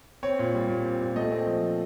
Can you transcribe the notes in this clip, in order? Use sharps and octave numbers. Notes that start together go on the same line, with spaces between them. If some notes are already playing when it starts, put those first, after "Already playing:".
C4 C#5
A#2
G3
A#2
C4
A#2
A3 D#5
C4
F3